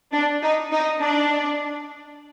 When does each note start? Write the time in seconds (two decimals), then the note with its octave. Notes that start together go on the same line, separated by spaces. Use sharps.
0.12 D4
0.42 D#4
0.72 D#4
1.00 D4